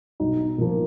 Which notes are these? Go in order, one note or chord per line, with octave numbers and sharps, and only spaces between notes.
B1 D#4
A#2 F3 A#3